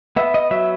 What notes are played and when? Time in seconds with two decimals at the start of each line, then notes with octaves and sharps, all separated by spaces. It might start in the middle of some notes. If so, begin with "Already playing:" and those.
0.16 B3 E5
0.34 D#5
0.51 F#3 E5